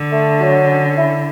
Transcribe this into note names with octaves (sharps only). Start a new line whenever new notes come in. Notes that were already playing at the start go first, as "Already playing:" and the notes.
Already playing: D3
A3
F#3
C#4
E4